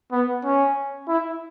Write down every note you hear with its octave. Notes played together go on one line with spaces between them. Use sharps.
B3
C#4
E4